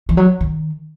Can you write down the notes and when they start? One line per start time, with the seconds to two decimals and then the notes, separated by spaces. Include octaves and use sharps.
0.09 E3
0.17 F#3
0.41 D#3